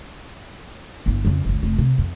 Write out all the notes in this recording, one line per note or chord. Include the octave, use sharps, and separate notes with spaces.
G1 E4
F2 C#3
F#1 C#2
F1
C3
F2